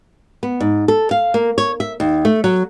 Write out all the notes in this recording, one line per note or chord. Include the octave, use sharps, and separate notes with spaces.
B3
G#2
A4
F5
A#3
C#5
E5
D#2
A3
F#3